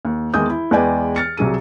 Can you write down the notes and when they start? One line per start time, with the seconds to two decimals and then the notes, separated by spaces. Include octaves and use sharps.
0.05 D#2
0.34 E2 D#3 G#3 D#6 G6
0.50 E4
0.71 E2 G#3 B4 D5 G5 G#5
1.16 F6 A6 C#7
1.37 C2 F#3 G#4 D#7